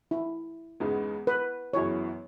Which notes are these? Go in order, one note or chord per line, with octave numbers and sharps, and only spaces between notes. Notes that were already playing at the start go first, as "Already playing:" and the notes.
E4
E2 C#3 G#3 B3 D#4
B4
F#2 C#3 E3 B3 E4 C#5